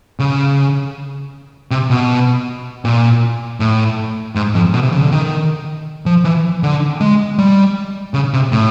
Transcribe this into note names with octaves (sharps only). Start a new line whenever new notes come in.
C#3
C3
B2
A#2
A2
G#2
F2
B2
C3
C#3
D3
D#3
F3
E3
D3
G#3
G3
C#3
C3
A2